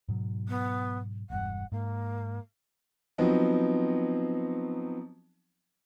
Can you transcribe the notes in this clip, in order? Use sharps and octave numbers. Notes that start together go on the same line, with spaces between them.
G#2 B2 F#3
B3
E1 E2 G2 F#5
G#2 A#3
F3 F#3 B3 C4 D#4